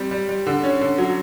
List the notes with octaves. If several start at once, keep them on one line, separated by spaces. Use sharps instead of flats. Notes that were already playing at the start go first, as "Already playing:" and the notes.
Already playing: G3 C4
G3
G3
D3
C#4
D3
F#3